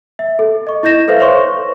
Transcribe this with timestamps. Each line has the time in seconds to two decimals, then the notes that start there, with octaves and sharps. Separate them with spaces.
0.19 E5
0.39 A4
0.67 D#5 C#6
0.83 E4 D#5 G6 A#6 E7
1.08 A4 B4 C5 E5 F5
1.20 C5 C#5 C6 C#6